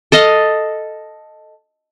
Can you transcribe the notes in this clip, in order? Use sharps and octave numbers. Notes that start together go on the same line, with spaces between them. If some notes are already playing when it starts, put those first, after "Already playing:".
A4 D#5 F5